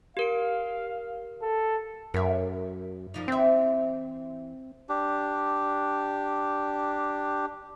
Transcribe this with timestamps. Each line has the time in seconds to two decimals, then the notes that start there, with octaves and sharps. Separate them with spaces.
0.17 G4 A#4 F5 D7
1.42 A4
2.14 F#2 A#4 E5
3.14 G2 F3 D#4
3.28 E3 C4 E5
4.89 D4 G4